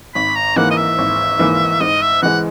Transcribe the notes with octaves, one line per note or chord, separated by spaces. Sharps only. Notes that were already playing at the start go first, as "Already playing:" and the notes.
G#1 B5
A#5
G#2 E3 A#3 F#5
D#5
E5
G#1
G#2 E3 A#3
G#2 D#5
E5
E3 G#3 F#5